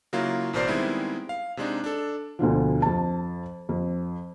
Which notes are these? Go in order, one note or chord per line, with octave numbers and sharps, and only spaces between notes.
C#3 F#3 A#3 E4 F4
A1 B2 A#4 C5 D5 C7
D#3 G3 G#3 B3 C4 E4
F5
C3 G#3 D4 D#4
D4 A4
D2 B2 D3 F3
F2 A5
F2